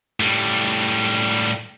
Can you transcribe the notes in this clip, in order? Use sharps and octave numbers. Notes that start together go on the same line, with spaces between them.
A2 G3